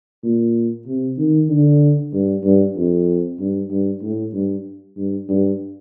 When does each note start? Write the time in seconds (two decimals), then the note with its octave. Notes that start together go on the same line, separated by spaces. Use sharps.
0.23 A#2
0.87 C3
1.18 D#3
1.49 D3
2.13 G2
2.44 G2
2.76 F2
3.39 G2
3.70 G2
4.02 A2
4.33 G2
4.97 G2
5.29 G2